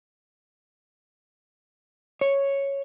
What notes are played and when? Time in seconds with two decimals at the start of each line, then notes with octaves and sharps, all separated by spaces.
2.21 C#5